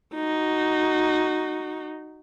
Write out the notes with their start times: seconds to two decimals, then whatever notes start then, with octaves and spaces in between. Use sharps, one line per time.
0.15 D#4 F#4